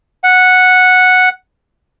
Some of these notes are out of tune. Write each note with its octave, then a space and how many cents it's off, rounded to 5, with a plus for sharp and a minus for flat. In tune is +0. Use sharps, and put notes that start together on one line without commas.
F#5 -5